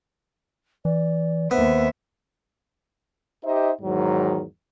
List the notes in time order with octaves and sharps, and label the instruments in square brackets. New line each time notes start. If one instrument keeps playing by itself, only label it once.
[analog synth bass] E3 [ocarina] D5
[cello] D#2 E5 [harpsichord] B3 [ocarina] C5
[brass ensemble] D#4 G4 C5 D#5 E5
E2 G#2 D#3 F#3